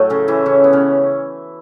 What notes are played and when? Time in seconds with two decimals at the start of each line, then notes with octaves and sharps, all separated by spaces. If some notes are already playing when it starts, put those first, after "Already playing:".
Already playing: A2 F#3 A3
0.10 C#3 C#4
0.28 E3 E4
0.46 C#3 C#4
0.64 B3
0.73 C#3 C#4